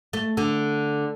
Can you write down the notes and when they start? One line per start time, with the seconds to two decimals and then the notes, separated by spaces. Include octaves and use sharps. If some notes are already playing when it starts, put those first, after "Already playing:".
0.13 A3
0.37 D3